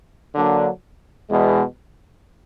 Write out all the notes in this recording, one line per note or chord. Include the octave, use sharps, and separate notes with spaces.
D3 F#3 A#3 D4
E2 B2 G#3